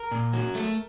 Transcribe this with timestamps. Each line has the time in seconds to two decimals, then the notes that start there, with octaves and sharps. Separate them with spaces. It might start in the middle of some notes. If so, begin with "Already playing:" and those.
Already playing: A#4
0.11 A#2
0.33 F#3
0.55 A3